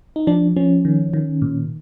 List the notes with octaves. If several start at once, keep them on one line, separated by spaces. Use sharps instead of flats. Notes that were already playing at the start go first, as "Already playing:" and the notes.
D#4
F3 D4
F3 C#4
D#3
D#3
A#2